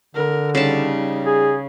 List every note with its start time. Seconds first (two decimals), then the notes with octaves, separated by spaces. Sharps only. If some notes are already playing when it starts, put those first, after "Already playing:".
0.15 D3 A#4
0.55 C#3 G3 D#4 A5
1.26 G#4